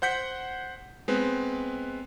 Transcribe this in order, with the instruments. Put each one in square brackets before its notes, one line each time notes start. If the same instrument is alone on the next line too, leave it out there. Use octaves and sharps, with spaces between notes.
[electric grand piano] C5 F#5 G6 B6 C#7
G#3 B3 C4 B4